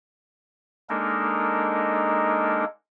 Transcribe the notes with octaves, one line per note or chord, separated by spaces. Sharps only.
G#3 A#3 D4 D#4 A4 A#4